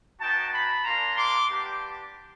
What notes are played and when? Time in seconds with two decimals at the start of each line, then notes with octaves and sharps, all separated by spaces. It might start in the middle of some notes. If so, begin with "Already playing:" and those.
0.20 B3 D#4 F#4 G5 A5
0.53 A5 B5
0.84 A#3 D4 F4 A#5 C6
1.16 C6 D6
1.48 B3 D4 G4